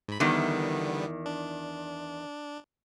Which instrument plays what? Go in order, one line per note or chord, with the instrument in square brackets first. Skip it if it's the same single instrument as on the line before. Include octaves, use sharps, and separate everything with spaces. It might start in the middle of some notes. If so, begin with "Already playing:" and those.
[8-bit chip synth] G#2 B5
[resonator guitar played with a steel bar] E2 D#3 [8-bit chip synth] D3 G3 B3
[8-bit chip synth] D4